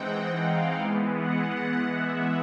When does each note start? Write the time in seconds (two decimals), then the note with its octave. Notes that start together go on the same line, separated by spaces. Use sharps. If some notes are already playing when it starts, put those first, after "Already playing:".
Already playing: E3 G#3 C4 D#4 F#5 G5
0.42 F5
0.80 E3 G#3 B3
1.16 F#5
1.90 E5